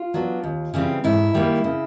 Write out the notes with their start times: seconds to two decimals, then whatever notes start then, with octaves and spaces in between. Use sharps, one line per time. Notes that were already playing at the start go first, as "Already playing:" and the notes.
Already playing: F4
0.14 F#3 B3 D4
0.44 D#2
0.74 C#3 E3 G3 C4
1.04 G#2 E4
1.34 D#3 G3 A#3
1.64 C#3